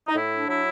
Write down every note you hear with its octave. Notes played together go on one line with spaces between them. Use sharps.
D#4
A2 E4
D4
F#3 E4